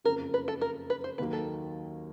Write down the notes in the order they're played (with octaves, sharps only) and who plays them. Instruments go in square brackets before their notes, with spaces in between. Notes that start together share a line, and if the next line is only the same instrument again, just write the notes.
[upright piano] F#1 F2 C#3 [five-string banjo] A#4
[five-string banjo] B4
A4
A#4
B4
C5
[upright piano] D#2 D#3 F#3 A#3 D#4 [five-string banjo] B4
[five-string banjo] A4